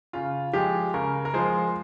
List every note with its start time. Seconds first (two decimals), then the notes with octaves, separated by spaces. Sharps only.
0.13 C#3 F4
0.53 F3 G#3 G4
0.94 C#3 A#4
1.25 A#4
1.34 F3 G#3 C5